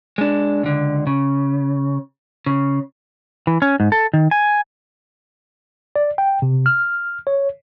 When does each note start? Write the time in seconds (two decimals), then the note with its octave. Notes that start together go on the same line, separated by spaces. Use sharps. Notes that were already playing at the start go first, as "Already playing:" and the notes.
0.18 G#3 D4
0.63 C#2 D3
1.07 C#3
2.46 C#3
3.47 E3
3.62 C#4
3.80 G#2
3.92 A4
4.13 D#3
4.31 G#5
5.96 D5
6.18 G5
6.42 C3
6.66 F6
7.27 C#5